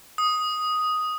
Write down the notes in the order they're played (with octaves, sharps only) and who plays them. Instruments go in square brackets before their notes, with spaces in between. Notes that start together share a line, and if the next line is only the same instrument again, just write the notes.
[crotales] D#6